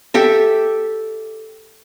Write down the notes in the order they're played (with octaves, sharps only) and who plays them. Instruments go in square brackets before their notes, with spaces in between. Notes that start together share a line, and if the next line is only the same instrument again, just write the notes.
[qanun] G4 A4 E5